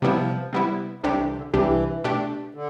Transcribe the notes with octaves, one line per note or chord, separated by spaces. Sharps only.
C3 F3 G3 B3 E4
C3 G3 B3 E4
C2 C3 G3 A3 D4 G4
E3
D3
C2 C3 E3 G3 D4 G4
B2 A3 D4 G4
D3